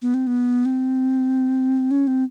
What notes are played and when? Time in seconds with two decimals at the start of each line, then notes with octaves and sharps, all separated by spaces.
0.02 B3
0.14 C4
0.27 B3
0.65 C4
1.91 C#4
2.07 C4